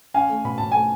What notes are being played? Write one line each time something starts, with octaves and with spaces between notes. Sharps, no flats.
C#4 F5 G#5
A3
B2 B5
B2 A5
A3 G#5